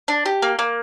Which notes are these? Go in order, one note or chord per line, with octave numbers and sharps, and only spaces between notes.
D4
G4
A#3
A#3